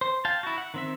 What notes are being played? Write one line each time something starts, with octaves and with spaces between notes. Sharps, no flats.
C5
F5 G5 A5
E4 F#4
F#5
D#3 C4 E5